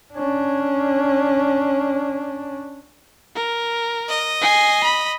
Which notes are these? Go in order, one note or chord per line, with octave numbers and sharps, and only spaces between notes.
C#4 D4
A#4
D#5
G#5 C7
B5